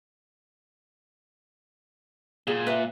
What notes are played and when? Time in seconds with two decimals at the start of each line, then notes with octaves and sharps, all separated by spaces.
2.47 A#2 G#4
2.67 B4 E5